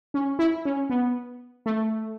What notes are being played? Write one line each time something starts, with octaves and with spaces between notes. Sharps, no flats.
C#4
E4
C#4
B3
A3